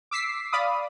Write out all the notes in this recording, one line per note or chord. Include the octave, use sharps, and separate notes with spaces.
D6 E6 B6 C7
D5 F5 B5 D6 D#6